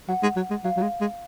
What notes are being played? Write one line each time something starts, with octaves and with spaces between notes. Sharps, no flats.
F#3 F#5
G#3
F#3
G#3
F#3 F5
F#3
G#3
G#3